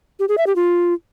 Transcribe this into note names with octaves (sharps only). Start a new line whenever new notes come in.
G4
G#4
E5
G4
F4